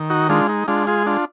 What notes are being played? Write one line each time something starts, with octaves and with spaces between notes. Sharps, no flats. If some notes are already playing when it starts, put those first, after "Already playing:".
Already playing: D#3
D#4 F#4
G#3 D4 F4
D#4
G#3 D4 F4
F4 G#4
D4 F4